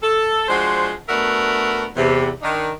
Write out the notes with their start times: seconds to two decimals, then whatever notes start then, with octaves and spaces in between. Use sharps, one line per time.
0.02 A4
0.48 F3 G#3 D4 F#4 C5
1.09 A3 B3 D4 F#4 A#4 E5
1.96 E2 C3
2.42 D#3 D4 D#4